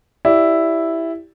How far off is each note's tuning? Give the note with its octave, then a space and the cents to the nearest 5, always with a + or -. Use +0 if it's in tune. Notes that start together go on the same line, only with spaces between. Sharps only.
E4 +0 G4 +0 D5 +0